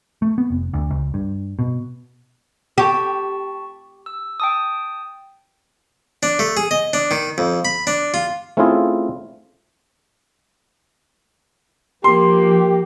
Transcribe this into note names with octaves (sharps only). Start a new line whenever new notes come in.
A3
B3
F1
D2
C#2
G2
B2
G4 A5 C#6 B6
E6
G5 A5 D#6
D4
A3
G#4
D#5
D4
D#3
F2
B5
D4
F4
A3 C4 C#4 E4 F4 G#4
F3 A#3 G4 C6